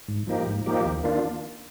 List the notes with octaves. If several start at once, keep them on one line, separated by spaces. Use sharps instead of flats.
G#2
F3 A#3 D#4 G4
G#2
F3 A#3 D#4 G4
D#2
D#3 A#3 D4 F4